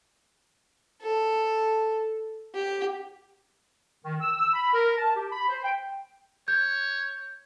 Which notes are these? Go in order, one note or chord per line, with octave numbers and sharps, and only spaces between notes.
A4
G4
D#3
E6
E6
B5
A#4
A5
G4
B5
C5
G5
C#5 G6